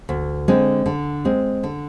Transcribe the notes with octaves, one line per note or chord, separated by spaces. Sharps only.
D2
D3 G#3 C4
D3
G#3 C4
D3